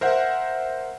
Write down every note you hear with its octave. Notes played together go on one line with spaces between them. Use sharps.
A#4 C5 E5 F#5